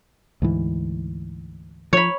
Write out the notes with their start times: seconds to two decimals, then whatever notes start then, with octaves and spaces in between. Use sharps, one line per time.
0.42 D2 G#2 E3
1.93 F3 C#5 B5